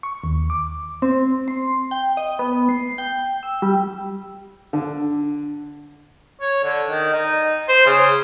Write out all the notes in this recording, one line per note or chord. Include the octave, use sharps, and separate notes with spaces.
C#6
D#2
D6
C4
C6
G5
D#5
B3
C7
G5
E6
G3
D3
C#5
D3
D#3
D#4
C5
C#3